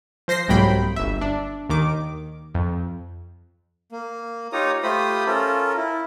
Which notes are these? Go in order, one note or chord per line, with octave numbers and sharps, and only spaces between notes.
F3 C5 A#6 C7
C2 G#2 F#3 A#3 G5 B5
G1 E5
D4
D#2 D#3 D6
F2
A#3
D#4 F4 G4 C#5 A#5 D#6
A3 F4 G4 C5 B5 D#6
C#4 F4 A4 A#4
E4